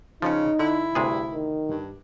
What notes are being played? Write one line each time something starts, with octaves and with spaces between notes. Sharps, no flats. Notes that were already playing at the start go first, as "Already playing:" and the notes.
C#3 F3 C#4 D#4
D3 E4
D2 G2 C3 G#4
D#3
G2